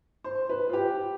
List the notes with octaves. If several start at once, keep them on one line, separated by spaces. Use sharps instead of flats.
C5
B4
F4
G4